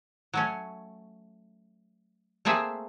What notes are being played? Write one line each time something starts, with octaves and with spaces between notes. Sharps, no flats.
F#3 A3 C#4
A3 A#3 C4 G#4 E5